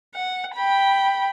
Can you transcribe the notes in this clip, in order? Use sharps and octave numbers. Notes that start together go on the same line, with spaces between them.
F#5
G5 B5